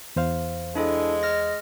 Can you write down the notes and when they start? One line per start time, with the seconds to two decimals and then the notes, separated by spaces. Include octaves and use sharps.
0.16 E2 C5 F5
0.75 G#3 D4 E4 A4
1.23 D#5 F6 A#6